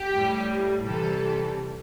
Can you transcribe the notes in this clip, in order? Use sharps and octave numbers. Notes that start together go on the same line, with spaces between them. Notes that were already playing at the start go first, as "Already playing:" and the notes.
Already playing: G4
A2 G3
C3 E3 G3 A4